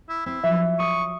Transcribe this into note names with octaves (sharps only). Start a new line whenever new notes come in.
E4
C4 E4
F3 F#3 E5
C#6 D#6 C7 D#7